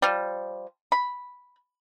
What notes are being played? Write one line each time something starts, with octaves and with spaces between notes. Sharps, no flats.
F3 G3
B5